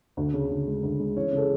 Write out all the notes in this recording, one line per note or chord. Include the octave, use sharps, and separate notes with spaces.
D2
C#3
D2
G#3
D2
G#3
E3 C#4 C#5
C#3 A4
G#4